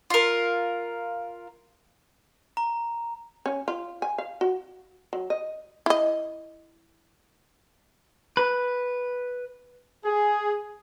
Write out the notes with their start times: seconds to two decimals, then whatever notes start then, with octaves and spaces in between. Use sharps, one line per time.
0.10 F4 A#4
2.57 A#5
3.46 C#4
3.68 F4
4.02 G#5
4.18 F5
4.41 F#4
5.13 F#3
5.30 D#5
5.86 E4 D#5
8.37 B4
10.04 G#4